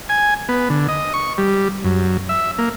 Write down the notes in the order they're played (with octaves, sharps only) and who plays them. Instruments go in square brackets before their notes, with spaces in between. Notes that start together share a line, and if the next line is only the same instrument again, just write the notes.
[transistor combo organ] G#5
B3
D3
D#5
C#6
G3
F#2
E5
A#3